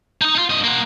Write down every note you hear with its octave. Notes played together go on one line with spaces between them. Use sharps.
D#4 D#5
D#4 F4
G2 D#5
A#3 F#5